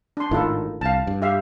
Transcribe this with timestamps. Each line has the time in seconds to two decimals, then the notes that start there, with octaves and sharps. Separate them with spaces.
0.17 D4 C6
0.31 G#1 A2 D#3 E4 F4 A4
0.81 C2 F5 A5
1.07 G2
1.22 G4 E5 F5